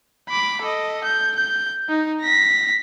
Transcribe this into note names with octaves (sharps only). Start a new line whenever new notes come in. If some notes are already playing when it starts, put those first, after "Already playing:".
B5 D6
A4 D#5
G6
G6
D#4
A#6 B6